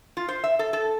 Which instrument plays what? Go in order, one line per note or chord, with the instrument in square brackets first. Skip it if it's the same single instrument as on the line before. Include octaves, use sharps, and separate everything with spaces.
[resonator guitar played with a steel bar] F4
C5
E5
A4
A4